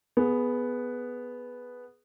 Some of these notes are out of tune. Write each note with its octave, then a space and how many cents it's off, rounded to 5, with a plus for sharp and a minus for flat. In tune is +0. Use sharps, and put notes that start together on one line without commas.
B3 +0 G#4 +15